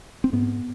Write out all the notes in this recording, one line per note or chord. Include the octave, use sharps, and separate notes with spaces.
C4
G#2 B3